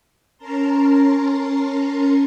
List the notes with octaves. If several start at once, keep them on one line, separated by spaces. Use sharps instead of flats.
C#4 A#4 A5 A#5 C6